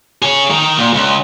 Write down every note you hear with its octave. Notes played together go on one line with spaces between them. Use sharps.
G#4 C#5
D#3 A#4
A#2
C#2